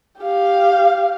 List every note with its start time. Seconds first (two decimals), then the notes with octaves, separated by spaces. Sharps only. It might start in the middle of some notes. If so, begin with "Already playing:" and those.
0.21 G4 F5